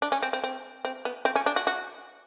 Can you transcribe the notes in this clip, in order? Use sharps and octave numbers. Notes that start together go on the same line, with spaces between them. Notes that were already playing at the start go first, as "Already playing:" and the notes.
D4
C#4
C4
C4
C4
C4
B3
C4
C#4
D4
F#4
F#4